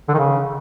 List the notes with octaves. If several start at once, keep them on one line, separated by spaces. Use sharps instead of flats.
D3
D#3
C#3